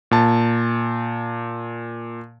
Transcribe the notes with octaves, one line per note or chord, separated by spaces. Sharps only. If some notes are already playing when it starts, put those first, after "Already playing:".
A#2 A5